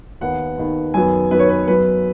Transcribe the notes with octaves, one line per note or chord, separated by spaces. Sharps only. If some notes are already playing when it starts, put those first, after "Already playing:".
D#2 D#3 B3 F#5
D#2 D#3 B3
F#2 D#3 F#3 B3 G#5
F#2 D#3 F#3 B3 B4
C#5
B4
F#2 F#3 B3 B4